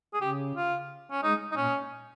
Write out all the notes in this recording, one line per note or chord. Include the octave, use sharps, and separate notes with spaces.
G#4
C#3 G4
F4
C#4
G#3 D#4
D#4
A#2 C#4